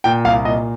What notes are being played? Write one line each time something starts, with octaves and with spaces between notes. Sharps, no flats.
A#2 G5
C2 F5
A#2 D#5